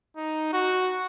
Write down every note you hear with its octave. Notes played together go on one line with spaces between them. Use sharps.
D#4
F#4